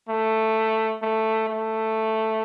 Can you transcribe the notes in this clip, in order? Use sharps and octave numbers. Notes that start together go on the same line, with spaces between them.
A3
A3
A3